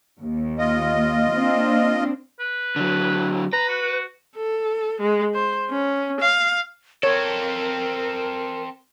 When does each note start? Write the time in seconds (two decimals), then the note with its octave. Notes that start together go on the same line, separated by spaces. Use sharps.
0.19 D#2
0.59 F4 D#5
1.31 A#3 C4 D4
2.40 B4
2.76 D3 F#3
3.53 B4 A#5
3.69 F#4
3.81 F#4
4.37 A4
5.01 G#3
5.34 C5
5.70 C#4
6.21 F5
7.03 C4 A4 A#4 C#5